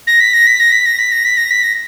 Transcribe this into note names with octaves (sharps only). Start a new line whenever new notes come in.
A#6
B6
A#6
B6
A#6
B6
A#6
B6
A#6
B6
A#6
B6
A#6